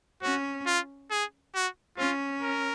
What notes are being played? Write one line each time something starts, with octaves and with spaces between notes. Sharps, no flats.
C#4 F#4
F4
G#4
F#4
C#4 F4
A#4